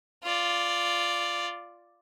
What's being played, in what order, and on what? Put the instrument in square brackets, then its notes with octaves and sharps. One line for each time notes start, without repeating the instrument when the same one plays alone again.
[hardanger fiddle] F4 D5